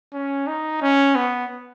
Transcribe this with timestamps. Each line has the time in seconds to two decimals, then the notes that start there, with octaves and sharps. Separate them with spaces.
0.13 C#4
0.47 D#4
0.82 C#4
1.15 B3